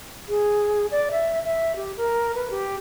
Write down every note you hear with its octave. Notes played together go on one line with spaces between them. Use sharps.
G#4
D5
E5
E5
G4
A#4
B4
G4